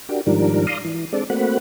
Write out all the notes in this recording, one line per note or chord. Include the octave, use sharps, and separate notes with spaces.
D4 F#4 G4 A#4
G#2 D#3 F3 G3 D4 A#4
D5 F5 A#5 C6 D#6
E3
G#3 C4 D4 A4 D5
A3 A#3 C4 F#4 F#5 B5